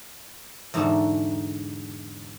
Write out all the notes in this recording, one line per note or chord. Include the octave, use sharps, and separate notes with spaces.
E2 G#2 D3 D#4 F#4 A5